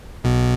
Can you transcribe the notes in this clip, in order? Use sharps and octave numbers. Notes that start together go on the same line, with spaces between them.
B1 B2